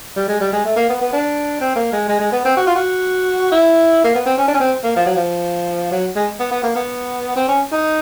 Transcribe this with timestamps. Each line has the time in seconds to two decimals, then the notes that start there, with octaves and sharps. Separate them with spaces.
0.16 G3
0.28 G#3
0.41 G3
0.52 G#3
0.65 A3
0.76 A#3
0.89 B3
1.01 B3
1.13 D4
1.60 C4
1.76 A#3
1.92 G#3
2.08 G#3
2.20 G#3
2.32 B3
2.45 C4
2.57 F#4
2.67 F4
2.76 F#4
3.52 E4
4.04 A#3
4.15 B3
4.26 C4
4.38 C#4
4.48 D4
4.54 C#4
4.60 C4
4.83 A#3
4.96 F3
5.06 F#3
5.16 F3
5.92 F#3
6.15 G#3
6.40 B3
6.51 B3
6.63 A#3
6.75 B3
7.36 C4
7.48 C#4
7.72 D#4